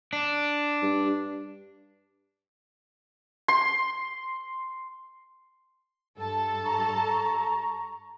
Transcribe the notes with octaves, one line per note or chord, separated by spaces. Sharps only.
D4
G2
C6
G2 A4 A5
A#5 C#6